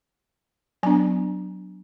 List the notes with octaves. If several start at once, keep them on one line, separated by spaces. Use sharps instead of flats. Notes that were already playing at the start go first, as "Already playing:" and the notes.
F#3 B3 D4 G#5